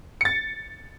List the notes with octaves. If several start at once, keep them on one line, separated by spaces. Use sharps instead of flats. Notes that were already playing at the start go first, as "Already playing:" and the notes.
A6 C#7